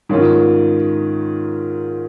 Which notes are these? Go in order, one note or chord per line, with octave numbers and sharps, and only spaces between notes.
G#2 D#3 C#4 F4